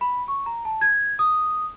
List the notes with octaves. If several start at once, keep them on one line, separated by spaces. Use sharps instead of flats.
B5
C#6
A#5
A5
G#6
D#6